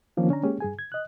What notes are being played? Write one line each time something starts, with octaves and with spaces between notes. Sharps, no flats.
D#3 F3 A#3 C4 C#4 D#4
D3 C#4 D4 A#5
G#3 A#3 C#4 G4 G#4
G2 G#4 G#5
G#6
D#5 F#6